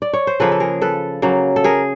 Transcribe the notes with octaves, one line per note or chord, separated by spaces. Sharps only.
D5
C#5
C5
C#3 F3 A#3 A4 B4
A4
G#4 A#4
A4 B4
C#3 F#3 A#3
A4
G#4 A#4